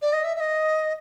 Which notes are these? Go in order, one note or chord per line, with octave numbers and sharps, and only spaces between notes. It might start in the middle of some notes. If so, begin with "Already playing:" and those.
D5
D#5
E5
E5
D#5